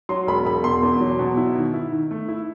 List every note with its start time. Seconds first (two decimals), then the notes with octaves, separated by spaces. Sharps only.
0.09 F#3 C6
0.27 E1 B5
0.46 E1 B5
0.64 B2 C6
0.83 E2
1.01 F#3
1.19 B2
1.37 E4
1.55 D#3
1.74 E4
1.92 D#3
2.11 A3
2.28 E4